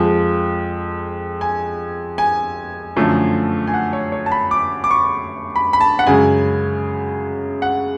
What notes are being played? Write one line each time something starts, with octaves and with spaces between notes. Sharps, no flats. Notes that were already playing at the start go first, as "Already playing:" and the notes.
Already playing: F2 F3 G#3
G#5
G#5
F#2 D3 F3 A3
G#5
F#5
C#5
C#5
A5
B5
D6
D6
C#6
B5
B5
A5
F#5
F#2 C#3 G#3 G#5
F#5